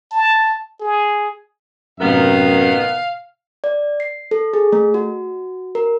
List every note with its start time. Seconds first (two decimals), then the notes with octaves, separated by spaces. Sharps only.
0.11 A5
0.80 G#4
2.00 F#2 A2 C3 D#3 B3 A#4 F5
3.64 D5
4.00 C7
4.31 A4
4.53 G#4
4.72 A3
4.94 F#4
5.75 A#4